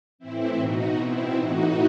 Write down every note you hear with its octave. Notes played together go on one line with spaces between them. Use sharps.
A2 E3 C4 E4
B2 D#4 F#4
B2 C4 E4
A2 E3 D#4 F#4